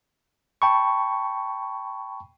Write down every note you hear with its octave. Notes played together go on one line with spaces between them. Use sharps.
G5 A5 B5 C#6